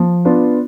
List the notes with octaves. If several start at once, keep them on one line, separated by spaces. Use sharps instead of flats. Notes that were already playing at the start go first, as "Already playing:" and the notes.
Already playing: F3
B3 D4 F4